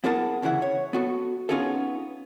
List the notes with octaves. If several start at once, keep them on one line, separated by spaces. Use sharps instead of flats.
B3 E4 G#4 A#4 F#5 A5
D2 C#3 E3 E4 F#5
C#5
B3 F#4 A4
B3 C#4 D#4 F4 G#4 A4